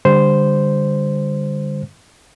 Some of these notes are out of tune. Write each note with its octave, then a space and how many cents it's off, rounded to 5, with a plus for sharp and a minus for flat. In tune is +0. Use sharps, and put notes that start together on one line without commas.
D3 +0 G3 +25 C5 -5